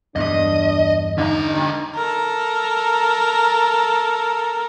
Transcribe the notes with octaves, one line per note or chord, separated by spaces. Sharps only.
E2 G2 D4 D#5
D3 D#4 A#5
A4 A#4